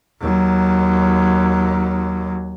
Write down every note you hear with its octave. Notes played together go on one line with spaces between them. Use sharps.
D#2 F#3